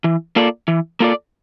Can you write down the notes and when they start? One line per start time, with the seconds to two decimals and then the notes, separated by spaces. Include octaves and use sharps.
0.04 E3
0.36 A#3 F4 A4 D5
0.68 E3
1.00 A#3 F4 A4 D5